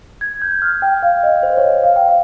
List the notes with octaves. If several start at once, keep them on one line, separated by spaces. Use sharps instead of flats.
G#6
G6
F6
G5
F5
D#5
C5
C#5
D#5
F5
G5
F5